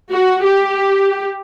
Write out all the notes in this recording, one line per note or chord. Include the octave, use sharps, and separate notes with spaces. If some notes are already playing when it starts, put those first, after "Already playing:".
F#4
G4